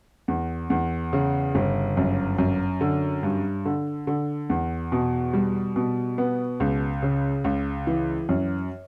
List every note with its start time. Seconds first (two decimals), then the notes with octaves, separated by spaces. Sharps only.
0.28 E2
0.70 E2
1.13 C#3
1.55 G1
1.97 F#2
2.38 F#2
2.81 D3
3.23 G2
3.65 D3
4.07 D3
4.50 E2
4.92 B2
5.33 G3
5.76 B2
6.18 B3
6.60 C#2
7.02 C#3
7.44 C#2
7.87 E3
8.29 F#2